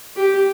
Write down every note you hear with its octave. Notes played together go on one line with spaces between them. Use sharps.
G4